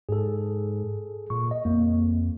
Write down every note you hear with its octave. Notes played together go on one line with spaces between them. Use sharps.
G#2 G#4 A4
A#2 C#6
D#5
F2 A#3